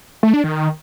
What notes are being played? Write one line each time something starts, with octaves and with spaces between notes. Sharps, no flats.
A3
D4
D#3